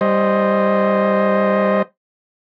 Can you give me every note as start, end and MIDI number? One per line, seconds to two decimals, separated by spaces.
0.01 1.82 55
0.01 1.82 72
0.01 1.82 75